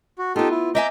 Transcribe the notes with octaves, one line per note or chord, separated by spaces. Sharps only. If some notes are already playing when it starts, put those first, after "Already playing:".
F#4
B3 D#4 F4 G4 A4
E4
D#5 E5 G#5 A#5 D6 G6